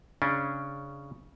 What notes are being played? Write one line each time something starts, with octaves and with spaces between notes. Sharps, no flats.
C#3 C#4 D4